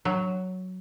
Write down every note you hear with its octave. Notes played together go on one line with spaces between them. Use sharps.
F#3